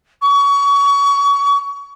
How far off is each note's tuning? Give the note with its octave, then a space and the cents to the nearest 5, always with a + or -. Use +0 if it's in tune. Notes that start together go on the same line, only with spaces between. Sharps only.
C#6 +30